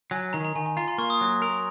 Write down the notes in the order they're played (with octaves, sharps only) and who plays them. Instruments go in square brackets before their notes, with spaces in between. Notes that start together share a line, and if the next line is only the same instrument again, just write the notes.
[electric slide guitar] F#3 [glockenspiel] G#5
[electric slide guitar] D#3 [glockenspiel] A#5
[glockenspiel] A#5
[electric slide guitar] D#3 [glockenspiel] G#5
[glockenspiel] G#5
[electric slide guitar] F4 [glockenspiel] A#5
[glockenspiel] C6
[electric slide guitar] A#3 [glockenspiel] C#6
[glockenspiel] D#6
[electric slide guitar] F#3 [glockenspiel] D#6
[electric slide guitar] A#4